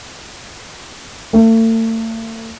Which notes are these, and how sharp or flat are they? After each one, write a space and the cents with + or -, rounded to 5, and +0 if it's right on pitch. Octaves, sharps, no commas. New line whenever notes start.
A3 +40